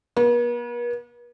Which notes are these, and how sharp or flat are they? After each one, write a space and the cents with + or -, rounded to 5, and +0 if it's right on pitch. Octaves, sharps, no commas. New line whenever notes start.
B3 -45